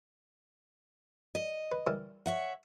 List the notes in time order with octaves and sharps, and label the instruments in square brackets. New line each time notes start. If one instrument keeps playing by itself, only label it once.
[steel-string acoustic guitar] D#5
[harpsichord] B4
E3 G3 A#4
[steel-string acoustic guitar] C#5 E5 F#5